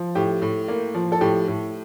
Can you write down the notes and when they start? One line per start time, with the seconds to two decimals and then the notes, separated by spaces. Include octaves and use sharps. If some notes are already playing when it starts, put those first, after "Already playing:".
Already playing: F3
0.15 A2 G4
0.42 A2
0.68 A#3
0.94 F3
1.12 A4
1.21 A2 G4
1.48 A2